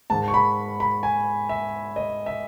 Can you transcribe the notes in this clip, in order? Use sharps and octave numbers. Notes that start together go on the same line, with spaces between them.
G#2 D#3 A5
C#6
B5
B5
G#5
E5
D#5
E5